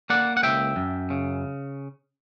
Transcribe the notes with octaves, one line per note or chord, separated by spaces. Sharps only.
A#3 D5 F#5
F#5
C#2 E5 G5
F#2
C#3